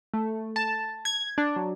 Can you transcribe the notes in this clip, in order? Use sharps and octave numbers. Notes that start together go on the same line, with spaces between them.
A3
A5
G#6
D4
F#3